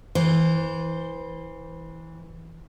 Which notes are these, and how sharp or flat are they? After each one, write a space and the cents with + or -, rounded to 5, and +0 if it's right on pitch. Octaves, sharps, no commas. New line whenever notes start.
E3 -20 C5 +0